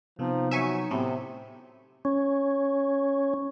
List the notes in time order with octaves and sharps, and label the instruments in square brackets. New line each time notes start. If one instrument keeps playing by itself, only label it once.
[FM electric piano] C3 B3 [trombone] F3 [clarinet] D#4
[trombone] F#3 [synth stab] E5 G#5 C#6
[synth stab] A2 [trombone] C3 [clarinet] B3 [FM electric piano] C4
[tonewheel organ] C#4